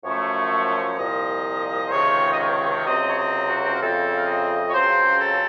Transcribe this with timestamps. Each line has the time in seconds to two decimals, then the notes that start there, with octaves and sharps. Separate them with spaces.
0.04 F#2 F3 A3 C#5
0.98 C2 A#2 F3 D#5
1.86 C5
1.91 C#2 C3 D#3 C#5
2.31 D#5
2.38 C#5
2.86 C#2 C3 F#3 C4 D#5
3.09 C#5
3.17 D#5
3.48 F#4
3.73 A#4
3.79 F2 C#3 A3 C4 A4
4.16 F5
4.26 D#5
4.66 C#5
4.73 C#2 C#3 F#3 C4 C5
5.20 A4